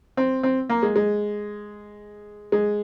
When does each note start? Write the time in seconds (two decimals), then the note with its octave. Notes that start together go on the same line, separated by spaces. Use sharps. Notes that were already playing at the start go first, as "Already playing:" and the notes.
0.17 C4
0.43 C4
0.69 A#3
0.83 G#3
0.96 G#3
2.52 G#3